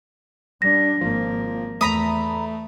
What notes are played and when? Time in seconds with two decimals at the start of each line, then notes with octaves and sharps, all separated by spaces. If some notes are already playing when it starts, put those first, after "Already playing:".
0.62 G3 D4 A#6
1.01 G#1 F3 A#3
1.81 E2 A3 A#5 B5 D#6